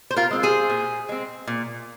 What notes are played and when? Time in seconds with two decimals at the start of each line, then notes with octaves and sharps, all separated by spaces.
0.11 C5
0.16 F4 A#4
0.31 G#3 C4
0.43 G#4 C5
0.70 A#2
1.09 G#3 C4
1.47 A#2